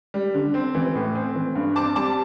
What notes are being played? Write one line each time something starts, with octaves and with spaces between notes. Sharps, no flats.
G3
D3
C4
E3
A2
C4
E3
G2
C4 A5 D6
G3 A5 D6